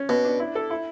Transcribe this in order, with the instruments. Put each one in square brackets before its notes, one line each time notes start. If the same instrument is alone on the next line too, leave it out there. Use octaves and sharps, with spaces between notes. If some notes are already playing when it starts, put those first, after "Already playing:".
Already playing: [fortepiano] C#4
[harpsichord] B2 [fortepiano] B3
[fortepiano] D4
E4
A4
E4